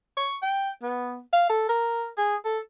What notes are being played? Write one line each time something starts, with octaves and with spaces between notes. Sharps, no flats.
C#6
G5
B3
F5
A4
A#4
G#4
A4